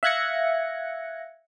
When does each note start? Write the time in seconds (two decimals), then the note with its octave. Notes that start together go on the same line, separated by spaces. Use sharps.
0.03 E5 F5 F#6 G#6 A#6 C#7